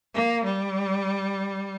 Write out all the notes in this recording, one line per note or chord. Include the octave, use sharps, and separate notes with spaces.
A#3
G3